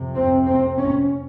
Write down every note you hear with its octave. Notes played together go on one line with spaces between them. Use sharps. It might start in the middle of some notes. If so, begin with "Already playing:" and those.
Already playing: F2 C3
C4
C4
C#4